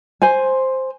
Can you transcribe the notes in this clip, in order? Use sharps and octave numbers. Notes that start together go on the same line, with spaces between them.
C5 G#5